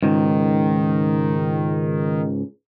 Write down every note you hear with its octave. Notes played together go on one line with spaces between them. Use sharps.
C#2 G#2 D#3